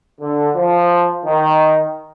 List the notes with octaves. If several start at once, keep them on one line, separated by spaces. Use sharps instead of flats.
D3
F3
D#3